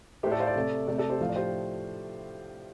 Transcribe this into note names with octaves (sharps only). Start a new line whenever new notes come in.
A2 A3 G4 C5
A4 D5
C5 F5
A4 D5
C3 A3
C3 A3 A4 D5
A4 D5
G4 C5
A2 F3 A3 F5
D5
G4 C5